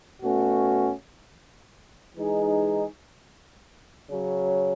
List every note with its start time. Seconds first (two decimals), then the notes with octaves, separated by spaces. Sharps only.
0.22 B2 A3 C#4 F#4
2.16 E3 G#3 D#4 G#4
4.08 C#3 F#3 C#4